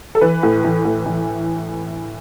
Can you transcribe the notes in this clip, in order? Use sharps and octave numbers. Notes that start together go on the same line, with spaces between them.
A4
E3 B4
A2
E3
A2
E3